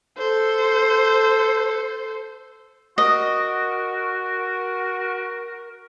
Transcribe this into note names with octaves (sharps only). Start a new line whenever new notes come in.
A4 C5
F#4 A#4 D#5